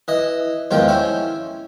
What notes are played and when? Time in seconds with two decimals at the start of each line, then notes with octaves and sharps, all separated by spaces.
0.08 E3 D#5
0.71 E2 G#2 D#3 F3 F4 G5
0.88 C#4 E4 C5